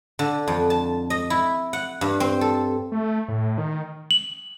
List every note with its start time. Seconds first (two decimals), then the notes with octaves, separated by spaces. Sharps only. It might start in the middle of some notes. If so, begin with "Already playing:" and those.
0.19 D3
0.48 F2
0.70 A5
1.10 D#5
1.30 E4
1.73 F#5
2.01 G2
2.20 C4
2.41 A4
2.92 A3
3.28 A2
3.58 D#3
4.11 F#7